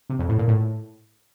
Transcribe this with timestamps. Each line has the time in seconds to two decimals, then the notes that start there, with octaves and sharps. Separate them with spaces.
0.10 C3
0.19 F2
0.29 A2
0.38 A#2
0.48 A2